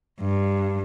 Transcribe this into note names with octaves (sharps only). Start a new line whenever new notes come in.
G2